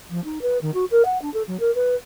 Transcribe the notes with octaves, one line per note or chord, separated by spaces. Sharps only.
F3
D#4
B4
D#3
F#4
A#4
F#5
D4
A4
F#3
A#4
B4